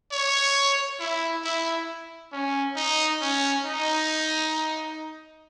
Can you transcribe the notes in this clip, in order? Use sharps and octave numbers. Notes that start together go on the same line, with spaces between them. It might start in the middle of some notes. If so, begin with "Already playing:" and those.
C#5
E4
E4
C#4
D#4
C#4
D#4